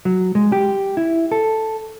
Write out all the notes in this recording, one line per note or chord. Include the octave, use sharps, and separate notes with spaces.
F#3
G#3
G4
E4
A4